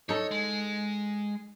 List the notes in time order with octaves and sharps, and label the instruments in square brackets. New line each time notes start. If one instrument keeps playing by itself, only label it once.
[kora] D#4 A4 [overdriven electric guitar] C#5
[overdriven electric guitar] G#3